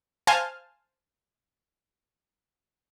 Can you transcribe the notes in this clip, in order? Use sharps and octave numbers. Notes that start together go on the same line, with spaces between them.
C5 F5 G#5 A5 F6